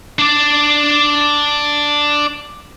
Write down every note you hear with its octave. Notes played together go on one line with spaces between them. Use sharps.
D4 D5